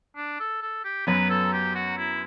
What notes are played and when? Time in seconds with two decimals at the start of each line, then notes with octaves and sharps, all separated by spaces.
0.16 D4
0.40 A4
0.62 A4
0.84 G4
1.07 F#2 F#3 B3 B4
1.30 A4
1.53 G4
1.75 F#4
1.98 E4